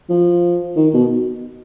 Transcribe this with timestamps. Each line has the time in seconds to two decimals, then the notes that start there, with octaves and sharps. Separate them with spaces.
0.09 F3
0.76 D#3
0.94 B2